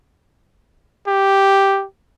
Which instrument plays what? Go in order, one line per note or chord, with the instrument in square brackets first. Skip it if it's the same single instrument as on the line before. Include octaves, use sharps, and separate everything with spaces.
[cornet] G4